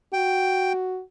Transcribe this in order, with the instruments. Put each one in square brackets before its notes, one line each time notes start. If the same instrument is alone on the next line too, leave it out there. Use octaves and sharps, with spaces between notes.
[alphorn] F#4 [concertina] G5